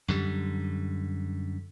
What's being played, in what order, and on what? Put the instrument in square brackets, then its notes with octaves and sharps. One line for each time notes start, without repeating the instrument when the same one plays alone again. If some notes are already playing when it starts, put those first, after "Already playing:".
[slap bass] F#2 D3 G3